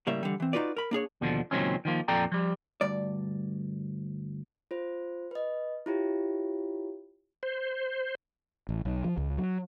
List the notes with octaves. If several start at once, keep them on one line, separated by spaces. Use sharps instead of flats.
A2 C#3 G3 A#3 E5
D3 E3 G3
E3 C4
D#4 F4 F#4 B4 D5
A#4 B5
A#3 D4 G#4 C#5
D#2 B2 D3 F3
C#2 A#2 D#3 F#3 C4 C#4
D#3 F3 A#3
F2 A#2 A4 D5 G5 A#5
F3 G3
D2 G2 D5
F4 C5
B4 D#5
E4 F4 G4 C#5
C5
A1
B1
F3
C#2
F#3